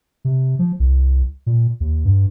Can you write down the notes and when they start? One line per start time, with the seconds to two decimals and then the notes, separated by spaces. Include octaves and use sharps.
0.25 C3
0.59 F3
0.80 C2
1.46 A#2
1.80 D#2
2.05 G2